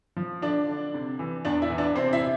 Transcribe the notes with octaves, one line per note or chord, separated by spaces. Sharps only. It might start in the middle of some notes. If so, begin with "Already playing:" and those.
F3
D3 D4 D5
D3
C3
E3
E2 D4 D5
E4 E5
E3
D4 D5
C3 C4 C5
E4 E5